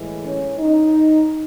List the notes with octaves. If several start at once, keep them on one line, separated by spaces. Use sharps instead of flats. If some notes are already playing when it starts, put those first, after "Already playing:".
Already playing: A2 E3 G#3
C#4
D#4